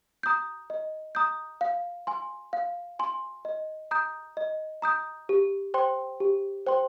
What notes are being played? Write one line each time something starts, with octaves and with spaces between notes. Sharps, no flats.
A#5 D#6 G6
D#5
A#5 D#6 G6
F5
G#5 C6
F5
G#5 C6
D#5
A#5 D#6 G6
D#5
A#5 D#6 G6
G4
C5 G5 C6
G4
C5 G5 C6